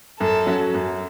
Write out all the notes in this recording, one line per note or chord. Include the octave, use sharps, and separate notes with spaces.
F#2 A4
F#3 C#4 F#4
F#2